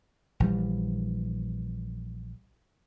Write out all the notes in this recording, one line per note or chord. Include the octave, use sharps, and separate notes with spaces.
A#1 E3 G3